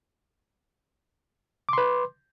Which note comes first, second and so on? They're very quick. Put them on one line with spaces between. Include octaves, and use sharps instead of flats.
D6 C6 B4